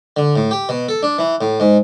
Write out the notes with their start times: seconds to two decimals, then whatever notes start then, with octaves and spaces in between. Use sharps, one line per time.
0.17 D3
0.36 A2
0.51 G4
0.69 B2
0.89 A4
1.03 D4
1.18 E3
1.41 A2
1.60 G#2